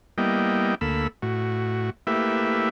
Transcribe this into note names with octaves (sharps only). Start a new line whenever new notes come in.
G3 A#3 B3 E4 D#5 G5
D2 A#3 A4 B5 E6
A2 F#4
A3 A#3 E4 G4 B4 E5